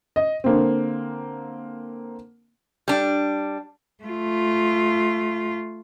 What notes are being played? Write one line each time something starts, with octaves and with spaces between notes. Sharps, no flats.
D#5
D3 A#3 C4
G3 D4
A3 F4